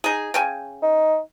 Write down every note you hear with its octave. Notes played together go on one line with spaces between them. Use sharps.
D#4 G#4
C#3 G5 G#5
D#4